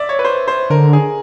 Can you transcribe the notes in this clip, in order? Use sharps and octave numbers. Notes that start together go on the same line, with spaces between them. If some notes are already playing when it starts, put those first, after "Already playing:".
Already playing: D5 E5
C#5
B4
C5
C5
D3 A#4
G#4